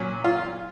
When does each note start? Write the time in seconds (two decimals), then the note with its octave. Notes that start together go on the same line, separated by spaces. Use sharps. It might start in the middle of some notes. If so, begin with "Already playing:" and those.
Already playing: A#2 F#3 C#4
0.24 F4